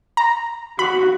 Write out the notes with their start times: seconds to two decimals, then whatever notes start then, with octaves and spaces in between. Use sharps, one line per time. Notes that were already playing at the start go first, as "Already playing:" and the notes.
0.17 A#5
0.79 F#4 B5